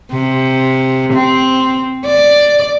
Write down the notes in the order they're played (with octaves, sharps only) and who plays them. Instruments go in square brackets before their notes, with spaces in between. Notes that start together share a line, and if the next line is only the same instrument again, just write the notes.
[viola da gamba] C3
C4
D5